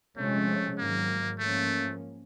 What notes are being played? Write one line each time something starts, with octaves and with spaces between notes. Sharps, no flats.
C3 F3 G#3 A3 C#4
G#2 D#3 F#3 A#3
G#2 F3 A3 A#3 C#4